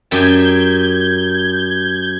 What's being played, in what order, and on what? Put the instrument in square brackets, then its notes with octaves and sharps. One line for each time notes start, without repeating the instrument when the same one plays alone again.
[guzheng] F#2 G4 A5 [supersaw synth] G6 G#6